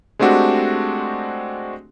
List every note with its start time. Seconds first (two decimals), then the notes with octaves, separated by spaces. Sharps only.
0.19 G#3 A3 C4 D4 F#4 G4